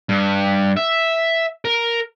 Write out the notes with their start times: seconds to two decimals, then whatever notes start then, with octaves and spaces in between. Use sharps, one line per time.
0.09 G2
0.77 E5
1.65 A#4